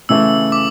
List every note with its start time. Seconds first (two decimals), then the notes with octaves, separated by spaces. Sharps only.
0.09 C#3 E3 A3 E6
0.52 D6